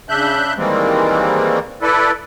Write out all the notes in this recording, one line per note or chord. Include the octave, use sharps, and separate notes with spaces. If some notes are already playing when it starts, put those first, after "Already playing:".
C#3 D4 E5 F#6 G6
D#3 E3 G3 G#3 A#3 C4
E4 A4 B4 D5